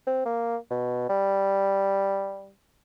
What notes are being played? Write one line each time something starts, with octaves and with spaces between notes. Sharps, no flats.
C4
A#3
B2
G3